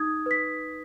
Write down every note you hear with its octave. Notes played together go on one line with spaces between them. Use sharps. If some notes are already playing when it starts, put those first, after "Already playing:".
Already playing: D#4 D#6 G#6
B4 B6